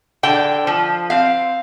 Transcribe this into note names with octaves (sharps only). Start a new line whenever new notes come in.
D3 G5
F3
C4 F5